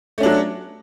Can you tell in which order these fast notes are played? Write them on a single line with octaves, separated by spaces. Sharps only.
A3 C#4 D4 F#3